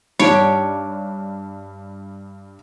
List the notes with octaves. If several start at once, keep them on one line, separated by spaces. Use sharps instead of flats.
G2 G3 D4 D#4 G4 C#5